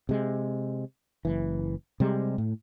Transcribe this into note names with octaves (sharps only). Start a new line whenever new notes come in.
C3 G#3
F#1 E3
C3 G3 G#3
A2